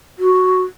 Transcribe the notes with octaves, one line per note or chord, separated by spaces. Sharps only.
F#4